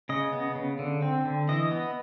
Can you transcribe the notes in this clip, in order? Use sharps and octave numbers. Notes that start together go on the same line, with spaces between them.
C#3 D#5
B3
C#3
D3
C4
D3
E3 D#5
B3